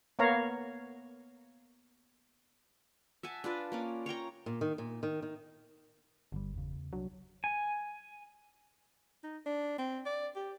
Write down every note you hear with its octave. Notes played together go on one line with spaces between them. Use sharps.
A#3 B3 C#5 F5 A#5
E5 F#5 G#5 A5
D4 F4 B4 D5
A#3 C#4 D5
C#5 F5 G5 A#5
A#2
D#3
A#2
D#3
D#3
G1 D3 G3
E2 C#3
C2 F#3 D4
G#5
D#4
D4
C4
D5
G4